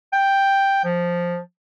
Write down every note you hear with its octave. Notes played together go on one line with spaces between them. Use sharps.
G5
F3